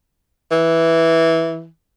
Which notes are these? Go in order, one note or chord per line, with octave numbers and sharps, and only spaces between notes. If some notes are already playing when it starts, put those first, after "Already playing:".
E3